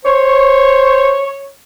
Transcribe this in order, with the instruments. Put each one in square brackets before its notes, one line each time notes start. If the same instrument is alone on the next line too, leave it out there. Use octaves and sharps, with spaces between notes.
[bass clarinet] C5 [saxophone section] C#5